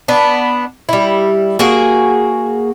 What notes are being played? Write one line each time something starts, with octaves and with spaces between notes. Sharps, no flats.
B3 D4
G3 E4
A#3 F#4 G#4